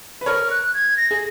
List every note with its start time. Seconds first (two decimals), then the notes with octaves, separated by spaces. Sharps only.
0.21 B4
0.26 A#4 C#5 F6
0.51 F#6
0.74 G#6
0.97 A#6
1.11 G#4